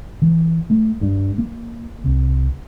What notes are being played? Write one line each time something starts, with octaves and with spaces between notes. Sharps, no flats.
E3
A3
G2
A#3
C2